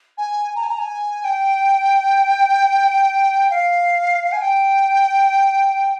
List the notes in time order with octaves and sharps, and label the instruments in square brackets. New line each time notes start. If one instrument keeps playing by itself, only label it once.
[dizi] G#5
A#5
G#5
A#5
G#5
G5
F5
G#5
G5